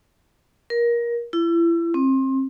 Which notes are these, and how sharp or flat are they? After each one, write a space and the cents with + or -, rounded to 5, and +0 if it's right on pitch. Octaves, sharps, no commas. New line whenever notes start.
A#4 +20
E4 +35
C4 +30